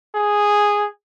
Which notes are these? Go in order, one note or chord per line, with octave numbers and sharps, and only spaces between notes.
G#4